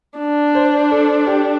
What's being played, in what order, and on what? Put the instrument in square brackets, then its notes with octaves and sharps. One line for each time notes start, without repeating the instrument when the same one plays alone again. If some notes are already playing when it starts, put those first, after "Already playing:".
[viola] D4
[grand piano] C5
A4
G4